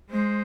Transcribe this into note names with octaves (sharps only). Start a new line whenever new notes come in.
G#3 C5